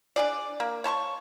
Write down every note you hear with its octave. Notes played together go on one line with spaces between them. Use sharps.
D4 G#4 D5
A#3
C#5 A5 C6 C#6